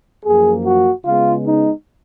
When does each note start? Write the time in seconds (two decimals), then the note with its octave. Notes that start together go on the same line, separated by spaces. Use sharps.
0.24 F#2 F3 A#3 G#4
0.66 F#4
1.05 C#3 G#3 B3 F4
1.47 D#4